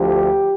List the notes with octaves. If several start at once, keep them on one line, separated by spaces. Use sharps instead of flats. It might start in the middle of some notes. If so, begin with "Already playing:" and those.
Already playing: D2 D3 F3 G4